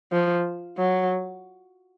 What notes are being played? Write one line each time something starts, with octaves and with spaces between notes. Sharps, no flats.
F3
F#3